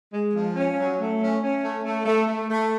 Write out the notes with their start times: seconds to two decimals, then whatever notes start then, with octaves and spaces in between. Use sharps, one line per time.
0.12 G#3
0.34 F3
0.55 C#4
0.77 F#3
0.98 A3
1.20 C#4
1.42 C#4
1.62 A3
1.83 A3
2.05 A3
2.26 A3
2.49 A3